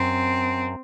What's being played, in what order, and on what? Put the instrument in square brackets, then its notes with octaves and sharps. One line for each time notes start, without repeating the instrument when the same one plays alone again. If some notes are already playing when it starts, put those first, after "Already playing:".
Already playing: [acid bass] F#2 [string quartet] C4